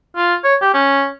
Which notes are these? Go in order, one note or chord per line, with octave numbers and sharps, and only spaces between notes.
F4
C#5
G4
C#4